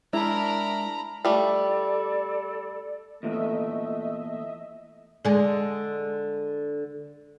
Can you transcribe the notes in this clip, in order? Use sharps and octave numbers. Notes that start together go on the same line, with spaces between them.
G#3 D4 E4 A#4 A#5 B5
G3 A3 A4 D5
E2 A#2 A3 D#5 E5
D3 G#3